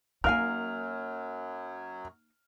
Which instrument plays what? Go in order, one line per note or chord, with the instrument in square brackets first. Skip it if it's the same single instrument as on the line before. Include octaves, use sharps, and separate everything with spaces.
[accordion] F#2 F#3 [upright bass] A#3 D#4 [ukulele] A#4 F5 G#5 [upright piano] F6